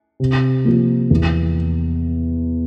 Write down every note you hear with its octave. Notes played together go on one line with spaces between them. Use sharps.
C3
F3 A#3
E2